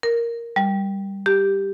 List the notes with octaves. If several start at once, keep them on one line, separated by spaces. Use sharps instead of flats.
A#4
G3
G4